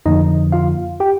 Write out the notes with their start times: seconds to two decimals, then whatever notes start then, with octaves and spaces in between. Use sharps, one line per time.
0.06 F2 D3 F3 A#3 D#4 D#5
0.52 F4 F5
1.00 G4 G5